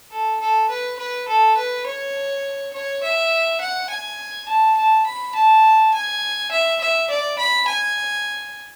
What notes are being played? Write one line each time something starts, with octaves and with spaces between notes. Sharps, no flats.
A4
A4
B4
B4
A4
B4
C#5
C#5
E5
F#5
G#5
A5
A5
B5
A5
G#5
E5
E5
D5
B5
G#5